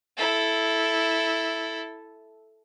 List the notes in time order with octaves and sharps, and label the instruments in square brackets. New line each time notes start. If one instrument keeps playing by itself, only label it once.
[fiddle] E4 A4